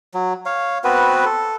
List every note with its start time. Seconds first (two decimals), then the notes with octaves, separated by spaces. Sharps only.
0.14 F#3
0.46 C#5 F5
0.84 B3 C4 F#4 B4
1.25 A4